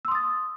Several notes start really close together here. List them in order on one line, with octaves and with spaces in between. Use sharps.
E6 C6 D#6 A6